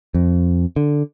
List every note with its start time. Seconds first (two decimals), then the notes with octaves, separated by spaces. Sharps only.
0.14 F2
0.76 D3